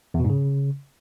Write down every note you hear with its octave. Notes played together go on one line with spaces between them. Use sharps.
E2
B2
G#2
C#3